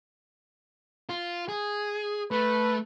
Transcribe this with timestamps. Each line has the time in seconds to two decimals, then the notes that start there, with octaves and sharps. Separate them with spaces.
1.09 F4
1.48 G#4
2.31 A3 B4